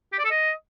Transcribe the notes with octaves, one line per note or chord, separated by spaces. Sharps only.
G4
D5
A4
D#5